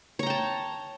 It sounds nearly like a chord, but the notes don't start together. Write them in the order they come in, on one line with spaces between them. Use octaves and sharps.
C#5 A#5 G5 A5